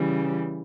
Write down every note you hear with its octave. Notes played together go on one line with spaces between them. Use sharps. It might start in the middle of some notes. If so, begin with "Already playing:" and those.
Already playing: C#3 E3 G3